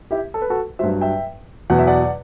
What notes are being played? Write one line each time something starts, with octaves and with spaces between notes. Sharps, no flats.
E4 G4
A4
B4
F#4 A4
G2 F#3 C5 E5
E5 G5
E2 B2 F#3 F#5
E5
D5 F#5